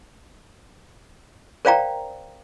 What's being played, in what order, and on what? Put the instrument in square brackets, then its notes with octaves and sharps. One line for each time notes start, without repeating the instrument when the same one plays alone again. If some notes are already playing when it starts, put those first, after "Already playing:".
[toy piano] A#4 C5 D5 F5 G5 A#5